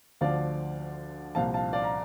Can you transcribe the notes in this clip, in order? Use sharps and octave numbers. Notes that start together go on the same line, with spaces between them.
D2 D3 F3 D5 F5
C2 A#2 F3 F5 A5
F5 A5
D5 F5
A#5